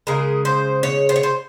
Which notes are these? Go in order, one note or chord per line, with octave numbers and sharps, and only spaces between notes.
C#3 G#3 A#4
C5
C#5
C5
C#5
C5